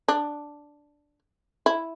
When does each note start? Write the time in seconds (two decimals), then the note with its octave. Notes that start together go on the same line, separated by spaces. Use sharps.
0.08 D4
1.66 E4